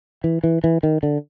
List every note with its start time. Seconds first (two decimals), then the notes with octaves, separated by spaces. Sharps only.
0.24 E3
0.44 E3
0.64 E3
0.83 D#3
1.03 D3